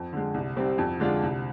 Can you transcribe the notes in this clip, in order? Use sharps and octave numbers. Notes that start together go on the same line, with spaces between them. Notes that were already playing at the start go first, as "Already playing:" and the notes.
Already playing: F2
D3 G#3
C2
C3 G3 C4 G4
F2
D3 G#3 D4 F4
C2